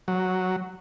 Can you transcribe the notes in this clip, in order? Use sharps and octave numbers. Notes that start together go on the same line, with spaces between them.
F#3